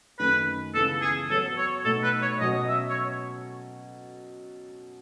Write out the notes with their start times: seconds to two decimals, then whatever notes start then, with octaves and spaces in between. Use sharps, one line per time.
0.19 F#2 D#3 A3 B4
0.74 C#2 C#3 E3 B3 A4
1.02 G#4
1.30 F#3 B3 F#4 A4 C#5
1.58 C#5
1.84 B2 A3 D#4 A4
2.03 B4
2.22 C#5
2.40 B2 F#3 C#4 D#5
2.68 E5
2.89 C#5